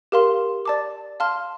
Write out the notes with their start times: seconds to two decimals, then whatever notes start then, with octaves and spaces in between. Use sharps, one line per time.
0.12 G4 A#4 F5 C6
0.65 D5 A5 D6
1.20 F5 A5 C6 F6